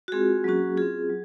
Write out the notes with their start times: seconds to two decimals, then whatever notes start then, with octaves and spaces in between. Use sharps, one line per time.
0.08 F#4
0.12 G#3 C4 F4 G#4
0.44 F#3 A#3 C#4 F#4
0.77 C4 F4 G#4
1.09 F#3